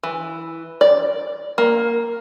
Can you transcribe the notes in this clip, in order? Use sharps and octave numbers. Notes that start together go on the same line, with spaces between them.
E3
D5
A#3